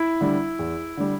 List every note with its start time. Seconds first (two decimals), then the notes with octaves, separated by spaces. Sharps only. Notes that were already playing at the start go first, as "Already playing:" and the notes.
Already playing: E4
0.21 D3 G3
0.59 E2
0.97 D3 G3